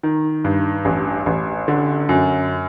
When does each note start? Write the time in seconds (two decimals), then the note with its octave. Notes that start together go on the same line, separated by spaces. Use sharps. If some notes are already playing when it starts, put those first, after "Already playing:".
0.03 D#3
0.44 G2
0.85 A1
1.26 A1
1.68 D3
2.09 F#2